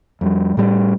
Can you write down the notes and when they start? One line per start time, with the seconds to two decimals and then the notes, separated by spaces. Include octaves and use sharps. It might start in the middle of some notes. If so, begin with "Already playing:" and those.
0.21 F2 G3
0.57 A2 G3